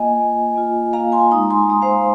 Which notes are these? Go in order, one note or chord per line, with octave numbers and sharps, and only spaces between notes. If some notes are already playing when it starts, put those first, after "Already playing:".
Already playing: A#3 F4 D#5 G#5
A#3 F4
A#3 F4
A#3 F4 F5 A#5
G#5 C6
G#3 D#4 A#5 D#6
G#5 C6
G#3 D#4 A#5 D#6
C5 F5